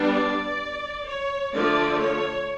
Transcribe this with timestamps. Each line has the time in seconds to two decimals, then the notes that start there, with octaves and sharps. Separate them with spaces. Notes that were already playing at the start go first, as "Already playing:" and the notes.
Already playing: G3 B3 D4
0.12 D5
1.06 C#5
1.54 D3 F3 A3 D5
2.01 C#5